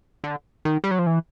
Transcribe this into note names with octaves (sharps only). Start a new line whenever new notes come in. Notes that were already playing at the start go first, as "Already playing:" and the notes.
D3
D#3
G3
F#3
F3
E3